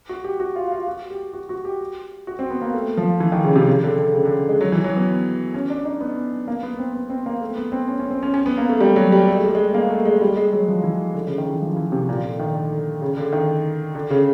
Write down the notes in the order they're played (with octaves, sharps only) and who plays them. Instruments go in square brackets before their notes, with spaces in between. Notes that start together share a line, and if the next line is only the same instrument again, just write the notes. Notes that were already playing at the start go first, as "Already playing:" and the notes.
[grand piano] F#4
G4
F#4
F4
F4
F#4
G4
F#4
F#4
G4
F#4
C4
B3
A#3
A3
F3
E3
D#3
C#3
C3
C#3
D3
D3
C#3
D3
G#3
F#3
E3
F#3
B3
C#4
D4
D#4
B3
A#3
B3
C4
B3
C4
A#3
A3
B3
C4
C#4
C#4
C4
C#4
C#4
B3
A#3
A3
G3
F#3
G3
A3
G#3
G3
G#3
A#3
A3
G#3
G3
G#3
F#3
F3
E3
D3
C#3
D#3
E3
F3
E3
C3
A#2
D3
D#3
D3
C#3
D3
D#3
D3
C#3